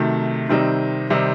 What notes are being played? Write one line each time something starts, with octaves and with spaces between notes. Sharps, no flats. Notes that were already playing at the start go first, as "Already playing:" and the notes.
Already playing: C3 D#3 F#3 A3
C3 D#3 G3 C4 D#4
C3 D#3 G3 C4 D#4